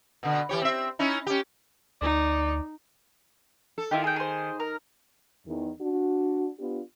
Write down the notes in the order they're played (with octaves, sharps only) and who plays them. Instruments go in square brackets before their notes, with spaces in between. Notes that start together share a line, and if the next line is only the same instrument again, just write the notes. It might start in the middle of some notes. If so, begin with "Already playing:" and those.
[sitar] B2 D3
E3 G4 C#5
C4 E5
C#4 D#4 E4
C#4 G4
[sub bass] D2 [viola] D#4 [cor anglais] D5
[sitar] A4
[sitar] D#3 [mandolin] E4 F4 G4
[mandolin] G#4 G5
G#4 C5
A#4
[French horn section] E2 D#3
D4 F#4
B3 D4 F4 G4